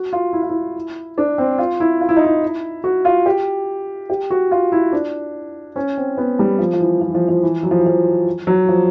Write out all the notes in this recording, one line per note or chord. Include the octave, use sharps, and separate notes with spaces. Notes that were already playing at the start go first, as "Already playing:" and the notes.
Already playing: F#4
F4
E4
F4
E4
D4
C4
F4
E4
F4
E4
D#4
E4
F#4
F4
G4
G4
F#4
F4
E4
D4
C#4
C4
B3
G3
F3
F3
E3
F3
E3
F3
F3
E3
F#3
F3
E3
F3
F#3
F3